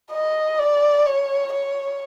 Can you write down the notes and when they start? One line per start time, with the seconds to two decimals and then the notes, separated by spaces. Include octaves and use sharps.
0.12 D#5
0.59 D5
1.06 C#5
1.53 C#5